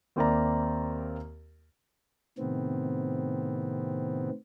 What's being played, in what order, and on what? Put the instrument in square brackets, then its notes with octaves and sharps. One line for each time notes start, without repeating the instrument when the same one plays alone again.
[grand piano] D#2 A#3 C4 D5 E5 A#5
[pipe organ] A2 C3 D#3 B3 C4